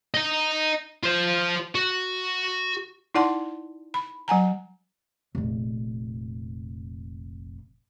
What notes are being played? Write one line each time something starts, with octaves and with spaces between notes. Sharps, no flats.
D#5 A#5
F4 C5
F#4
D#4 E4 D5 F#5 A5 C6
B5
F#3 F#5 G#5 A#5
F1 A#1